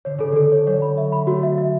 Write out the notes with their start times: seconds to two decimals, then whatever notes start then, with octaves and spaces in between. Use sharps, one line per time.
0.05 D3 C#5
0.18 C#3 A4
0.32 D3 A4
0.52 C#5
0.67 F#3 C#5
0.82 B5
0.98 E5
1.12 B5
1.27 A3 F#4
1.43 E5
1.58 E5